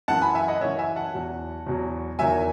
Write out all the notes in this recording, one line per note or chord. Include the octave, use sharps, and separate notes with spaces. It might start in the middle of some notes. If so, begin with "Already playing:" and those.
F#2 E3 F#5 A5
G#5 B5
E5 G#5
D#5 F#5
F#2 E3 C#5 E5
E5 G#5
F#5 A5
E2 B2 F#3
E2 B2 F#3
E2 D#3 F#3 E5 G#5